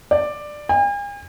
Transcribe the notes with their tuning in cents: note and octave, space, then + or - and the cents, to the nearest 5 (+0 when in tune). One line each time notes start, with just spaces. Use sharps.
D5 +10
G#5 -45